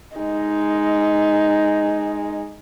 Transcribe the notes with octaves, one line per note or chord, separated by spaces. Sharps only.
G#3 D#4